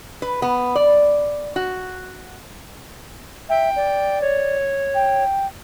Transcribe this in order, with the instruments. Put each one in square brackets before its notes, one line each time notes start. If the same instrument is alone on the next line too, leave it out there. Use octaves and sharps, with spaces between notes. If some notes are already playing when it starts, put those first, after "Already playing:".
[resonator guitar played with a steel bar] B4
B3
D5
F#4
[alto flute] E5 [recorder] G5
[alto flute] D5
[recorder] C#5
[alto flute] G5